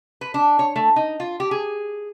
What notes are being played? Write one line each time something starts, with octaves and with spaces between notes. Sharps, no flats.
B4
D4
C#5
A3
D#4
F4
G4
G#4